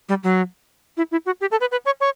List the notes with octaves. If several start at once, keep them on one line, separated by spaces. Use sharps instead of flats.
G3
F#3
E4
E4
F#4
G4
A4
B4
B4
C#5
C#5